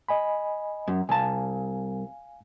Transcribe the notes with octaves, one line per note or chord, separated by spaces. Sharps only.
D#5 G#5 B5
F#2
C2 F5 G#5 A5